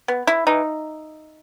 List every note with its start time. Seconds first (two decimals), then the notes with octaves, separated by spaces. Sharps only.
0.08 B3
0.27 E4
0.47 E3 D#4